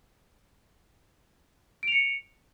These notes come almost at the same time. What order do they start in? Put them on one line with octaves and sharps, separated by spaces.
D7 F7 C#7